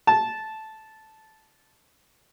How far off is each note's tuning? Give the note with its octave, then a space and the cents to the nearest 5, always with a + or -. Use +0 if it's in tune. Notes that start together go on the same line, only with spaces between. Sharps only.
A5 -10